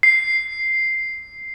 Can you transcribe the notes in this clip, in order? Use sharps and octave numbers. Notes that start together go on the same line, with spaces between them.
C7